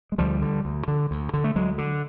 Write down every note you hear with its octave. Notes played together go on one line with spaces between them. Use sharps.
G#3
D2 F3 G3
D3
D2
D3
D2
D3
A3
D2 F#3 G#3
D3